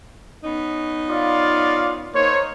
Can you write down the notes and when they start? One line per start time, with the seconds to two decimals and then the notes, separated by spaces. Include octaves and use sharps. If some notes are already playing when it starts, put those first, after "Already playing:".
0.44 B3 C#4 D#4
1.09 F4 D5 F5
2.15 A#3 D#4 C5 C#5